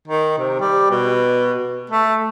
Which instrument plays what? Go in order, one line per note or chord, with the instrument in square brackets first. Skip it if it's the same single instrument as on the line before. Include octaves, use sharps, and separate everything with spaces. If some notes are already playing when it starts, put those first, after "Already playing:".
[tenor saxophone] D#3
C3
G3
B2
A3